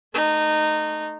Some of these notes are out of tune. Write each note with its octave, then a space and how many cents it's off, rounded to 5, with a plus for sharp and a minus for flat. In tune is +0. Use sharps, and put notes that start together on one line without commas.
A3 -10 D#4 -20